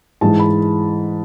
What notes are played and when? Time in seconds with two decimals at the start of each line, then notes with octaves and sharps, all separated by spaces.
0.21 G#2 E3 G#3 A5
0.40 B5